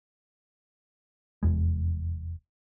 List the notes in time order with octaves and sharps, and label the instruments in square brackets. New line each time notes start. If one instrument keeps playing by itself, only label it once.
[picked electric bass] F1 E2 G#3